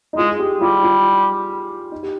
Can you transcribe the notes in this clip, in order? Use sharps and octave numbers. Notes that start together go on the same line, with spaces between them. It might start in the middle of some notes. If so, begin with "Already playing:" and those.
D#4
G#3 F4
G#4
G4
G3 F4
F4
D#4
G4